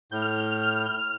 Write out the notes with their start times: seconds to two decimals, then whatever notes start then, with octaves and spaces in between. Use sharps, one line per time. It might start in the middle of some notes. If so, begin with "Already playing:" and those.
0.12 A2 F6 G6